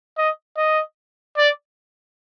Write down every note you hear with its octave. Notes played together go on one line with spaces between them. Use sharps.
D#5
D#5
D5